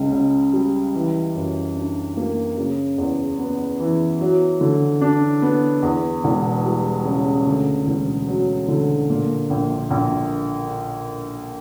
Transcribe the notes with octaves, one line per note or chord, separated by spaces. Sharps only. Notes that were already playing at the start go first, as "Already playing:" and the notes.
Already playing: C#2 C#3
C#2
G3
E3
F#2
D4
A#3
C#3
E2
B3
E3
F#3
D3
D4
B3
E2
E1
G3
C#3
D2
E1
F#3
D3
A#2
A#1
A#1